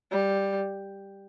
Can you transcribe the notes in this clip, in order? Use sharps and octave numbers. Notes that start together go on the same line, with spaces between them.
G3